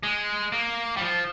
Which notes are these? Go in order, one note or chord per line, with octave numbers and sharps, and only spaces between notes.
G#3
A#3
G3
F3